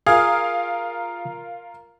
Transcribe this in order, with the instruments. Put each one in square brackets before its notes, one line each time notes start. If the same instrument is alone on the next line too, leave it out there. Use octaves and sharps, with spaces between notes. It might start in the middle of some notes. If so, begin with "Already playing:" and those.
[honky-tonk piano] F4 A#4 F5 [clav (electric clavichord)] G#4